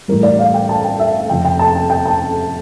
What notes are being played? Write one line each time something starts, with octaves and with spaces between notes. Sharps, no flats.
A2 E3 G3 A#4
D5
F5
G5
A5
G5
E5
F2 C3 F3 G5
G5
A5
G5
G5
A5